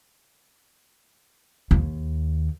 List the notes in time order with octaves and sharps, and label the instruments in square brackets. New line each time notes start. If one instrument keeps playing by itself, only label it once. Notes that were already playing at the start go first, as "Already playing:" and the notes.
[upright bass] D#2